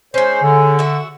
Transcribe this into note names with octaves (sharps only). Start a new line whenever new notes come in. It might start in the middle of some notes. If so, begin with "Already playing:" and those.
G#3 C#4 C5
D3
F#4 E5